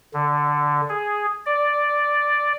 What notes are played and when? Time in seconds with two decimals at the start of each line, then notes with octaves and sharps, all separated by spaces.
0.14 D3
0.89 G#4
1.46 D5